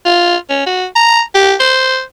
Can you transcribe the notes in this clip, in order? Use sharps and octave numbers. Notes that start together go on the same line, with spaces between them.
F4
C#4
F#4
A#5
G4
C5